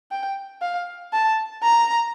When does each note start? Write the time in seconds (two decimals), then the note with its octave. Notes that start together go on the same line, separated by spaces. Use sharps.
0.11 G5
0.62 F5
1.13 A5
1.63 A#5